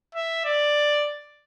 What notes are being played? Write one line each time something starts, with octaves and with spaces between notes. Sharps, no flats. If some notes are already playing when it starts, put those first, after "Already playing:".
E5
D5